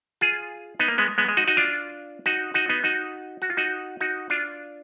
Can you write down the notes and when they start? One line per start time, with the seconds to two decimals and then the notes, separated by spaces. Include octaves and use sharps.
0.21 F4 G#4
0.79 B3 D#4
0.88 A#3
0.98 G#3 B3
1.18 G#3 B3
1.29 G#3
1.37 D#4 F#4
1.47 D#4 F#4
1.57 D4 F4
2.26 D#4 F#4
2.54 D#4 F#4
2.69 B3 D#4
2.84 D#4 F#4
3.42 F#4
3.50 F4
3.57 D#4 F#4
4.01 D#4 F#4
4.30 D4 F4